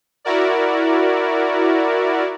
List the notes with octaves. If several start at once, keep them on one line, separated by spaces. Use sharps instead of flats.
E4 F#4 A#4 D5